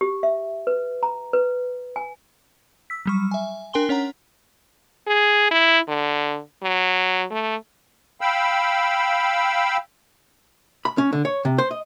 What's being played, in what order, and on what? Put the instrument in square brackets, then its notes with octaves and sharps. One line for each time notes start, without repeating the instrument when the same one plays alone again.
[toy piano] G4
E5
B4
A#5
B4
G#5
[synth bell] E6 B6
F#3 G3 C#6
E5 G#5
D4 A#4 G5 G#5 C6 G7
C#4 C#5 F#5 A#5
[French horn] G#4
E4
D3
F#3
A3
[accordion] F5 G5 B5 E6
[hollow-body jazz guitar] B5
C#4
D3
C#5
C3
C5
D#5